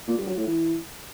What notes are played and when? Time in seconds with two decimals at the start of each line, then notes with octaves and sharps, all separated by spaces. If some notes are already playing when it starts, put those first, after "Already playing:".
0.07 A#2
0.17 G2
0.27 F#3
0.37 A2
0.47 E3